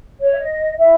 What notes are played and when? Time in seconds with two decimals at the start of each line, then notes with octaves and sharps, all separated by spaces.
0.20 C#5
0.32 E5
0.40 D#5
0.77 E4 E5